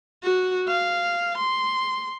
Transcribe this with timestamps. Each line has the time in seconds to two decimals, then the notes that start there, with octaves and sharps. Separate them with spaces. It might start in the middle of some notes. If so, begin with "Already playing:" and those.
0.23 F#4
0.68 F5
1.38 C6